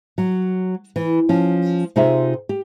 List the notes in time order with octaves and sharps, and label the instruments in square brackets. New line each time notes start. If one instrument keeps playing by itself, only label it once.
[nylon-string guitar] F#3
E3
F3 C#4
C3 D#4 F4 G#4 E5
G4